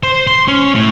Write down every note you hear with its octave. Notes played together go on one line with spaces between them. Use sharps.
C5
C6
C#4
A2